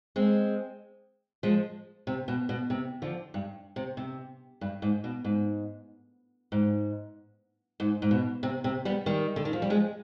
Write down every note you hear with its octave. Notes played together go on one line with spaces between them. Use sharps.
G#3 C4
F3 G#3
C3
B2
B2
C3
D3 F3
G2
C3
C3
G2
G#2
B2
G#2
G#2
G#2
G#2
B2
C3
C3
G3 B3
D#3 G3
D3
D#3
F3
G3
F3 G#3